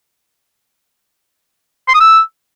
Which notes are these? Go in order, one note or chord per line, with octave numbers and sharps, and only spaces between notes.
C6
D#6
E6